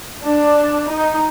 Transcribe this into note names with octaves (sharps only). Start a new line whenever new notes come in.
D4
D#4